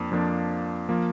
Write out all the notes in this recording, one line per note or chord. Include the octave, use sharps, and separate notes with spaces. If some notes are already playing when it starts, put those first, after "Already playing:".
Already playing: F2 F3 A#3 D4
F2 F3 A#3 D4
F3 A#3